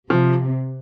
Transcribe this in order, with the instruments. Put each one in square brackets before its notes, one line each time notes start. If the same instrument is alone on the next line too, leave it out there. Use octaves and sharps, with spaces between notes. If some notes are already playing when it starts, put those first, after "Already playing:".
[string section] C3 [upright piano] F3